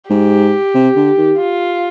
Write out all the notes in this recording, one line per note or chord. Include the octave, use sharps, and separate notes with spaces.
G#2 G4
C3
D3
D#3
F4